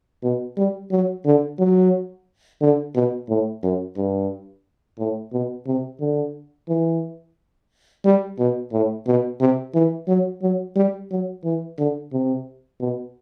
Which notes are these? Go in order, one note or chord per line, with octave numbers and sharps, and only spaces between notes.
B2
G3
F#3
D3
F#3
D3
B2
A2
F#2
G2
A2
B2
C3
D3
E3
G3
B2
A2
B2
C3
E3
F#3
F#3
G3
F#3
E3
D3
C3
B2